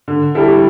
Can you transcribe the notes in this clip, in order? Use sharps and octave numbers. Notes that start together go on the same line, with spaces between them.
D3
G3 E4 A4